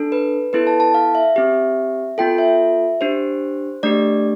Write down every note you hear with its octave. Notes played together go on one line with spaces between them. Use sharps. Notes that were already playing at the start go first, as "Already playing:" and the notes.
Already playing: D4 A4
B4
B3 E4 A4 B4
A5
A5
F5
E5
C4 G4
B3 F4 A4 G5
E5
D4 G4 C5
A3 D4 G4 D5